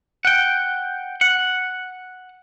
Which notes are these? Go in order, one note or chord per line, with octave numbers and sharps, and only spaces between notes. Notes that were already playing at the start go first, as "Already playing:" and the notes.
F#5 G5
F#5